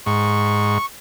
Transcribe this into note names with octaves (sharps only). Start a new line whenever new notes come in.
G#2 C#6